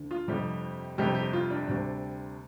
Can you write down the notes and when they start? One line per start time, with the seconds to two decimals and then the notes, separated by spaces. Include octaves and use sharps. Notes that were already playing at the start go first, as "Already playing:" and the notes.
Already playing: D2 D3
0.11 F4
0.28 G1 F2 C3 G3 G4
0.98 G1 F2 C3 G3 G4
1.15 G4
1.33 F4
1.50 D4
1.67 D2 C3 G3 D4